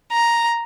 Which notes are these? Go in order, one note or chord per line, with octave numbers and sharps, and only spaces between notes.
A#5